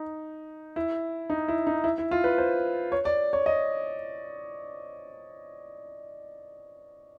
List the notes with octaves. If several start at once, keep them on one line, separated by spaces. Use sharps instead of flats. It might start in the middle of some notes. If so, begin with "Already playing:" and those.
Already playing: D#4
E4
D#4
E4
D#4
E4
E4
F4
B4
C5
C#5
D5
C#5
D#5